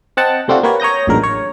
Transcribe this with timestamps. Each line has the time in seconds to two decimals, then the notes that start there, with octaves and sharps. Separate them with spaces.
0.17 C4 D#5 F#5 G5 A5
0.48 C3 A3 C4 D4 F4 F#4
0.63 A#3 G4 B4 C#5 F#5
0.80 C#5 A#5 D#6 G6 A#6
1.07 A1 F#2 A#2 D3 G#3 A#4
1.23 C#5